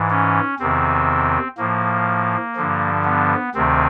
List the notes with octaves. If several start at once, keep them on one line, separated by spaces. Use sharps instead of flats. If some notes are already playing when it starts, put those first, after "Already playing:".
Already playing: G#2 E3
C#4
E2 C3 D#3 C4
A2 F3 A#3
G2 D3 F3
B3
D2 C3 D#3 C4